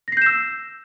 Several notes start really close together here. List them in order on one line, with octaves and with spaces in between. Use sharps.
A#6 C7 G6 E7 E6